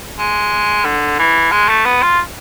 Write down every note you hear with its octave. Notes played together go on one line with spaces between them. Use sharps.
G#3
D3
E3
G#3
A3
B3
F4